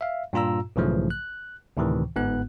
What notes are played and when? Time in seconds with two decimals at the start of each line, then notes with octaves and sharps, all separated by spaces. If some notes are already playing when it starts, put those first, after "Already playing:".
0.01 E5 F5
0.33 G2 A#2 F4 A#5 E6
0.76 B1 G#2 C#3 E3 F3 A3
1.10 F#6
1.77 D2 A2 C3 D#3 E3
2.16 G1 G#2 B3 F#6